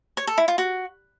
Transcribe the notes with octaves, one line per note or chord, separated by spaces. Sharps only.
C#5
A4
E4
F4
F#4